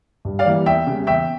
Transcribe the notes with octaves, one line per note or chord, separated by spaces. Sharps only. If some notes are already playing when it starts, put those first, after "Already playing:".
G2
D5 F5
E3 G3 A#3
E2 E5 G5
C#3 G3 A#3
E2 E5 G5